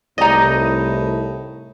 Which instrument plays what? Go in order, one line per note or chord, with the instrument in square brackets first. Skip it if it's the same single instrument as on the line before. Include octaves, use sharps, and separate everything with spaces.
[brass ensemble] C2 [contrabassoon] A2 [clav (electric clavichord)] D#4 D#5 [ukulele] D5 A#5